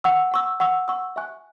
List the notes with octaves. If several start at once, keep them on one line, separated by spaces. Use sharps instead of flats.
F#5 C#6 E6
F#5 C#6 E6
F#5 C#6 E6
F#5 C#6 E6
E5 G#5 C#6 F#6